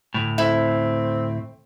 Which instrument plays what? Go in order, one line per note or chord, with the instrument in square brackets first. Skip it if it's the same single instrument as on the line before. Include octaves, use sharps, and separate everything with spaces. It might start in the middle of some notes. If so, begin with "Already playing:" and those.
[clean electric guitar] D2 A2
[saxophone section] A3 C4 [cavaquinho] E4